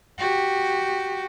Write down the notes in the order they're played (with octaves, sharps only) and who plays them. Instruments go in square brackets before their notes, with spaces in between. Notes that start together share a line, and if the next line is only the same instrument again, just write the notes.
[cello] F#4 G4